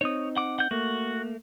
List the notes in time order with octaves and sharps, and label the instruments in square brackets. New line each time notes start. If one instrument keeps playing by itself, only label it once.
[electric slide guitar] C4 D#4 [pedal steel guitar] C#5 D#6
[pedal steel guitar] F#5 D6
F#5 G6
[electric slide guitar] A3 A#3 [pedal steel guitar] F#4